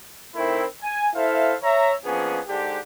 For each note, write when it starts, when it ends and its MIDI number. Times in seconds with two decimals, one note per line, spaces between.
0.35 0.64 51
0.35 0.64 57
0.35 0.64 60
0.35 0.64 64
0.82 1.08 80
1.15 1.54 64
1.15 1.54 69
1.15 1.54 72
1.15 1.54 76
1.15 1.54 77
1.63 1.93 73
1.63 1.93 76
1.63 1.93 82
2.05 2.40 53
2.05 2.40 58
2.05 2.40 59
2.05 2.40 61
2.05 2.40 62
2.05 2.40 68
2.48 2.78 44
2.48 2.78 50
2.48 2.78 62
2.48 2.78 67